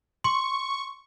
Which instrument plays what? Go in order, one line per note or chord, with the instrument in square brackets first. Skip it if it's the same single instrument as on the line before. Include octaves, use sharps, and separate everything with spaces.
[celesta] C6 [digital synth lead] C#6